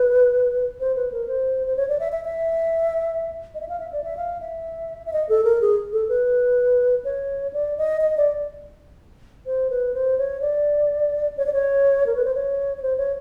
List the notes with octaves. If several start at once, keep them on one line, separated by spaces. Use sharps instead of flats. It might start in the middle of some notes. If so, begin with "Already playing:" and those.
Already playing: B4
C5
B4
A#4
C5
C5
C#5
D5
E5
E5
E5
D#5
E5
F5
E5
D5
E5
F5
E5
E5
D#5
A4
A#4
G#4
A4
B4
C#5
D5
D#5
D#5
D5
C5
B4
C5
C#5
D5
C#5
D5
C#5
A#4
B4
C5
C#5
C#5
C5
C#5